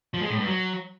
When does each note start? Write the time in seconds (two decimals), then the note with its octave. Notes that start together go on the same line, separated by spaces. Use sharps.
0.14 F3
0.22 G#3
0.30 A2
0.38 G2
0.47 F#3